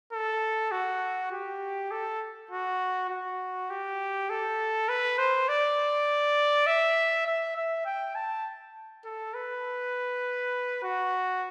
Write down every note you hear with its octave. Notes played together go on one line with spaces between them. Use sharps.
A4
F#4
G4
A4
F#4
F#4
G4
A4
B4
C5
D5
E5
E5
E5
G5
A5
A4
B4
F#4